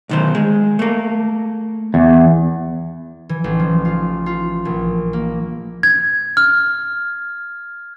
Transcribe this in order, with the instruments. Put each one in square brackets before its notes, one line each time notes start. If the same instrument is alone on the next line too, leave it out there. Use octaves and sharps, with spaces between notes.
[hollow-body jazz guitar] B1 D#3 C5
G#3
A3 A#3
[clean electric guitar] E2
[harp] E3
A1
F3
F4
F4
A#1
A#3
[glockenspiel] G#6
F6